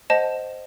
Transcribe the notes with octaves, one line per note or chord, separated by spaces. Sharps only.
C5 D#5 F#5 A5